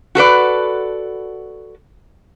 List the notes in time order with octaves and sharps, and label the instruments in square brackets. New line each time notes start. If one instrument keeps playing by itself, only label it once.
[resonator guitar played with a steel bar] F#4 A4 B4 D5